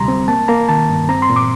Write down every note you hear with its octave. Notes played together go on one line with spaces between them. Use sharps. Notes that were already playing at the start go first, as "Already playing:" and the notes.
Already playing: D2 C3 G3 A#5 C6
C4
A#3 A5
A#3 A#5
D#3 A5
G2
C4 A#5
C6
A#2
D6